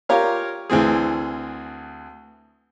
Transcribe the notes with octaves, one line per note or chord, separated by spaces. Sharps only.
F4 G4 A#4 C#5 F5
D2 E3 C4 G#4